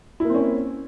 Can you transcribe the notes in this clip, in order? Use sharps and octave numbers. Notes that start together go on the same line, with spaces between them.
A#3 C4 C#4 E4